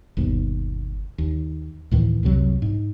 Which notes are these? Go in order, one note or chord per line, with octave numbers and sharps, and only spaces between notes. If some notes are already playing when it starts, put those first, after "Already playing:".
G1 D#2 B2
D#2
D2 A2 D#3 E3
C2 F2 C3 F#3
G#2